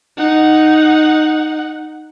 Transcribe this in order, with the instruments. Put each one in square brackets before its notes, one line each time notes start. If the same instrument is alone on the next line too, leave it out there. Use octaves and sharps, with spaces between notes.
[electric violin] D#4 F#5